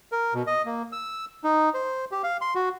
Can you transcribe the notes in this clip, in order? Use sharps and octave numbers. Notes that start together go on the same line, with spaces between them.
A#4
B2
D#5
A#3
E6
D#4
C5
G4
F5
C6
F#4